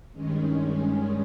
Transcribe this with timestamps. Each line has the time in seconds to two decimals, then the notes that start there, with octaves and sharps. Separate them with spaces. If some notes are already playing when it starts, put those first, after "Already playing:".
0.13 G2 D#3 G#3 C#4